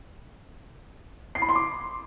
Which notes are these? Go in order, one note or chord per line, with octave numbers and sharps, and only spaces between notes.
C7
B5
C6
D6